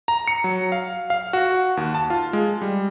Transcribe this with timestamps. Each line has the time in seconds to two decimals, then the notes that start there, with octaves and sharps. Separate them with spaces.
0.08 A#5
0.28 C#7
0.44 F#3
0.72 F5
1.10 F5
1.33 F#4
1.77 D#2
1.95 A5
2.10 F4
2.33 G#3
2.62 G3